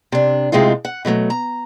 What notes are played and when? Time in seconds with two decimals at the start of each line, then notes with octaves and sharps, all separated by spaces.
0.12 C3 D4
0.52 A2 C3 G#3 C4 D#4 F4
0.85 F#5
1.05 B2 D3 F#3 A3
1.30 A#5